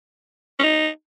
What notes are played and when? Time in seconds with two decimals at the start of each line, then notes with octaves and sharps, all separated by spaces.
0.59 C#4
0.63 D#4